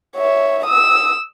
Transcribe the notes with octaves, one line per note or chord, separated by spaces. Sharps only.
C#5 E5
D#6 E6